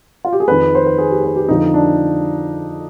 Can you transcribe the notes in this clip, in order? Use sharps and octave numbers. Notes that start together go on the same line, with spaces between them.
F4
G4
G#4
F2 D#3 B4
C5
B4
G#4
G4
B4
G4
F2 D3 F3 D#4
D4